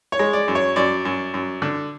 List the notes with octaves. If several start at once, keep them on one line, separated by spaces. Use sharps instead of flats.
C#5
G#3
D5
F#2
C#5
F#2 D5
F#2
F#2
D3